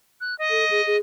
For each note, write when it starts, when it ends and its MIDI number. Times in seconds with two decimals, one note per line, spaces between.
0.21 0.37 90
0.39 0.97 75
0.50 0.65 69
0.71 0.82 68
0.87 0.99 68